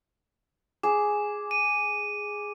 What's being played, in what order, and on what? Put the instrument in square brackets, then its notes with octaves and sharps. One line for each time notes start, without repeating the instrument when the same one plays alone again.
[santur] G#4 [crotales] D6
[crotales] D#7